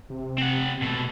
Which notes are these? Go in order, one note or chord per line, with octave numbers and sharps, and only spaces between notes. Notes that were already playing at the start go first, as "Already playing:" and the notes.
C3
C4 F#5
B2 A3